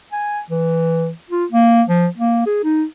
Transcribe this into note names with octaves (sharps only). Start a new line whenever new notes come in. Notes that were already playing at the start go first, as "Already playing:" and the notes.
G#5
E3
F4
A#3
F3
A#3
G#4
D#4